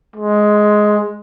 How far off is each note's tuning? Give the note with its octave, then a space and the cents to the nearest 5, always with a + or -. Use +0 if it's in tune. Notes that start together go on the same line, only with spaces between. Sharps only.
G#3 +10